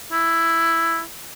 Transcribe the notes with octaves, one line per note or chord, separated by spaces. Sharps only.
E4